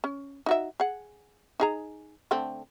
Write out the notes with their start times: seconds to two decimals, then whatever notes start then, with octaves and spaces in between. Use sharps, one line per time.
0.04 C#4
0.46 D#4 F#4 E5
0.80 G#4 F#5
1.60 D#4 G#4 A#5
2.31 D3 A3 C4